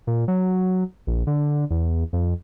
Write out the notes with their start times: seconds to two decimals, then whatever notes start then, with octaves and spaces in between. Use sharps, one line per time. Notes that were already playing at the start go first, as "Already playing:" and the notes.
0.07 A#2
0.28 F#3
1.07 A#1
1.27 D3
1.71 E2
2.13 F2